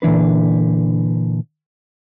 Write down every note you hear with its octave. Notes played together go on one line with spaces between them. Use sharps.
A#2 D3 E3 D4 B4